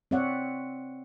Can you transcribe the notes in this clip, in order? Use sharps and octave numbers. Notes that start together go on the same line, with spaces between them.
C4 C#5 D5 E5 F#5